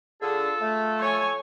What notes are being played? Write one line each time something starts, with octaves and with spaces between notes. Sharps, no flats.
D3 F4 G#4 A4
A3
C#5 G#5